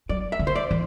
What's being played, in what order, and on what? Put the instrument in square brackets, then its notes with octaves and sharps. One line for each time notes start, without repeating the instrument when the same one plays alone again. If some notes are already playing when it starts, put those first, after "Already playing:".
[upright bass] F#3 [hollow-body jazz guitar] D5
[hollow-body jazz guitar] E5
[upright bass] D3
[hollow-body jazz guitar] C5
D5
[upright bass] E3